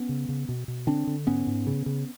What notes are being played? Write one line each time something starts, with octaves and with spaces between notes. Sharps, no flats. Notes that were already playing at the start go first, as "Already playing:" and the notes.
Already playing: B3 C#4
C#3
C#3
B2
B2
D3 C4 D4
D3
G#2 B3 C#4
G#2
C#3
C#3